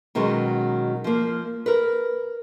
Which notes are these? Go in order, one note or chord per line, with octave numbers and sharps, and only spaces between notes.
B2 D#3 F#3 G#3 C#4
F3 A#3
A#4 B4